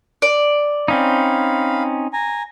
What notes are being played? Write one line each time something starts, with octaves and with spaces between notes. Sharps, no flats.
D5
C4 C#4 D#4 F5 B5
G#5 A#5